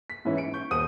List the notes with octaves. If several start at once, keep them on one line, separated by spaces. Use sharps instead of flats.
B6
G#2 E3 C#4 E4
C#7 D7
C#6 G6
D#1 C5 D#6 D#7